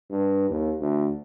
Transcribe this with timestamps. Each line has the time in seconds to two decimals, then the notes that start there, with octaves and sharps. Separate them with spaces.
0.10 G2
0.50 D#2
0.80 D2